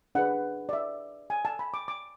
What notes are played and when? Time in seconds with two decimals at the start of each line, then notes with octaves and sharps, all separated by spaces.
0.15 D4 G#4 B4 F#5
0.69 D5
0.73 E5
1.30 G#5
1.45 A5
1.59 B5
1.74 D6
1.88 D6